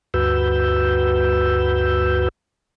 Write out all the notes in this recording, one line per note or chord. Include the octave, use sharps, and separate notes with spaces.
D2 G2 F#4 B4 E6 G6